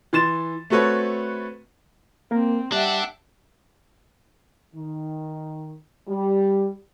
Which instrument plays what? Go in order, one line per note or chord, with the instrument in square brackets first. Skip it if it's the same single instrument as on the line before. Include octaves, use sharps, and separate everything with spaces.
[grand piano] E3 C6 A6 E7
A3 C4 F#4 A4 B4 C#5
[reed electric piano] A#3 A#4 [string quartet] C4
[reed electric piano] G3 F#6 [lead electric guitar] D4 [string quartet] E5 F#5 G5
[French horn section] D#3
G3